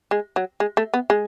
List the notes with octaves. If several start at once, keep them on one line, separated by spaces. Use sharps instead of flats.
G#3
F#3
G#3
A3
B3
G#3